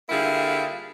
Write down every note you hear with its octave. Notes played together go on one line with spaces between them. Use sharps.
D3 G3 A#3 E4 F4 G#4